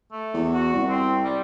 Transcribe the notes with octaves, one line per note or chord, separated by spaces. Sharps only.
A3
E2
F#4
C2
C4
G3